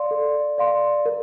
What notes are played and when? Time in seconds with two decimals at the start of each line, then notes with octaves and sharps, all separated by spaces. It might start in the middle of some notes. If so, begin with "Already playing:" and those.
Already playing: D5 F5 C6
0.11 A4
0.58 D5 F5 C6
1.06 A#4